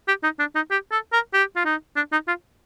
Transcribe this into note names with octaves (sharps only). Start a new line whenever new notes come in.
G4
D#4
D4
D#4
G4
A4
A#4
G4
F4
D#4
D4
D#4
F4